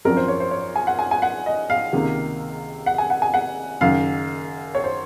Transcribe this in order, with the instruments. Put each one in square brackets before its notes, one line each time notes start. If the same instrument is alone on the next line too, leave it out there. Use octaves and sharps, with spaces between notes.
[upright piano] G#1 F#2 F3 C4 A#4
C5
C#5
C5
C#5
G#5
F#5
G#5
G#5
F#5
D#5
F5
C#2 C3 D#3 A#3
F#5
G#5
F#5
G#5
F#5
F#1 F#2 D#3 F5
C#5
C5